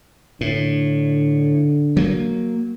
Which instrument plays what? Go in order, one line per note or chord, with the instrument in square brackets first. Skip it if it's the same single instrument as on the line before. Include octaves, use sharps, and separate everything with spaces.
[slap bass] A2 [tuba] D3
[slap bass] F#3 A#3